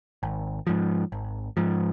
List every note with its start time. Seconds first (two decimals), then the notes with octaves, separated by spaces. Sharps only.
0.23 G#1
0.67 G#2 F3
1.12 G#1
1.57 G#2 F3